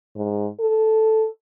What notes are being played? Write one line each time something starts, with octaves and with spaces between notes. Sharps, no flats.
G#2
A4